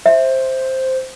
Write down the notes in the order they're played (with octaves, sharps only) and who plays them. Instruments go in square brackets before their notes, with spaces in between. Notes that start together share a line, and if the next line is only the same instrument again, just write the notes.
[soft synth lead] C5 [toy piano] E5